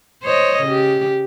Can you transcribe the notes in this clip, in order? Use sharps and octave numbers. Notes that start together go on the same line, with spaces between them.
C5 C#5 D#5
C#3 G4